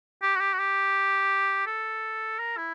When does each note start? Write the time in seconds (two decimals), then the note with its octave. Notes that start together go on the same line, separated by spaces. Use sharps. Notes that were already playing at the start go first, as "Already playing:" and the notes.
0.23 G4
0.36 F#4
0.40 G4
0.53 F#4
0.59 G4
1.67 A4
2.39 A#4
2.57 E4